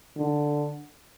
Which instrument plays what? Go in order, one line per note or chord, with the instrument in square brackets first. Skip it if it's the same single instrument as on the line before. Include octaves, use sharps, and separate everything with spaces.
[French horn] D3